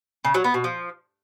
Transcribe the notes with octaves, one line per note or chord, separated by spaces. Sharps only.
C#3
F#3
B3
B2
F3